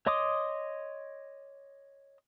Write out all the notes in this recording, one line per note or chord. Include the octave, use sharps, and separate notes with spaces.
C#5 D#5 C6 D6 D#6